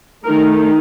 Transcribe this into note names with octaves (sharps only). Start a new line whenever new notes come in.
D#3 A3 D#4 A#4